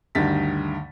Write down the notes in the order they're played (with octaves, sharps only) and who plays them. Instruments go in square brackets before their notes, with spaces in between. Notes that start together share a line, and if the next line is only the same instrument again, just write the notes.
[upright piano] D2 G2 D#3 A6 B6